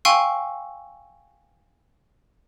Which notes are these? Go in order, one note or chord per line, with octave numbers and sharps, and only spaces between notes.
F5 G5 G#5 C6 C#6 E6